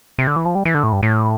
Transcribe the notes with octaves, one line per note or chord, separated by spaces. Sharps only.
C3
D3
E3
F3
G3
E3
D3
A2
G2
A2